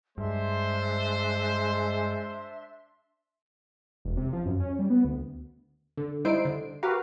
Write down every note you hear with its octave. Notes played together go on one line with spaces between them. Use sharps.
G2 G#3 D4 C5 E5 C6
E1
C3
F3
F#2
C#4
G3
B3
D2
D3
G3 D#4 E4 C5 C7 D7
D3
F#4 G4 A#4 B4 F5